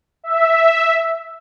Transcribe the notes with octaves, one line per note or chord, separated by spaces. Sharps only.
E5